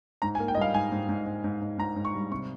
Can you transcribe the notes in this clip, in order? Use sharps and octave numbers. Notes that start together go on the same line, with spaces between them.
G#2 A#5
G#5
A#3
G5
D#5
G3 F5
G#2 G#5
G#2
G#2
G#2
G#2
G#2
G#2 A#5
G#2
C#6
G3
C3 C#6